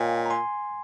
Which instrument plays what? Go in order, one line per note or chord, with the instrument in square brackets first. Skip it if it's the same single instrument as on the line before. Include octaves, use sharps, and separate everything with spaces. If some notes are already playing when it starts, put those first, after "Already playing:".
Already playing: [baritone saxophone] A#2 [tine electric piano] C#5 D#5 F5 G5 G#5
[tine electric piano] A#5
G#5 C6